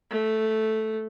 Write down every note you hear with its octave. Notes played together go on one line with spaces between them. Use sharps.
A3